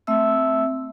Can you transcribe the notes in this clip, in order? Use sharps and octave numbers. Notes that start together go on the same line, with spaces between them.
A3 C4 E5 E6